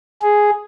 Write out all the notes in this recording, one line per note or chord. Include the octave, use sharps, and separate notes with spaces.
G#4